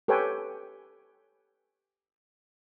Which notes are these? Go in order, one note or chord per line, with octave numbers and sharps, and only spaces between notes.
G4 A4 B4 C#5 G5 G#5